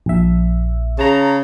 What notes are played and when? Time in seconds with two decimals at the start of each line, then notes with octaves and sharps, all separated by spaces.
0.06 A#1 E5
0.99 C#3 A5 A#5